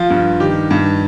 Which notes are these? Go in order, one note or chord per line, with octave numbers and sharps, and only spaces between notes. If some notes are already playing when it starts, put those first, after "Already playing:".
Already playing: F3 F4
G2
D#3 G4
G2